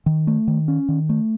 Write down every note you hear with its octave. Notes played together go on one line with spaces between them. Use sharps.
D#3
A3
D#3
C#4
D#3
A3